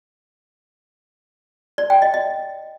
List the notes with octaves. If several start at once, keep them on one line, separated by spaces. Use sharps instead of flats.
D5
G5
D#5
D#5